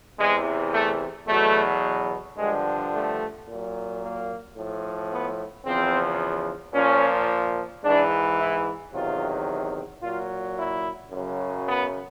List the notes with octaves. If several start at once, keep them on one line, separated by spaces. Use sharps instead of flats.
E2 C3 E3 G#3
A3
E2 B2 F#3 A3
G2 D3 F3 G#3
A3
A#2 F#3
A#3
A2 F3
B3
E2 C#3 F3 C4
A#2 F3 C#4
G#2 E3 D4
E4
E2 C3 D#3 F#3 F4
A#2 F#3 F4
E4
F#2 C#3 F#3
B3